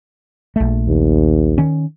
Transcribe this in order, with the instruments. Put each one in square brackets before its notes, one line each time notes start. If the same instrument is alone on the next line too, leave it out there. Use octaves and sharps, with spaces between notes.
[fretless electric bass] A#1 A3
[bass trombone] D#2
[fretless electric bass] D#3 C#4